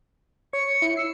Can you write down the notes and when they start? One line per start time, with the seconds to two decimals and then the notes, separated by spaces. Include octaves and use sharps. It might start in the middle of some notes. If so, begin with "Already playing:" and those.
0.53 C#5 C#7
0.82 E4
0.97 E6 C7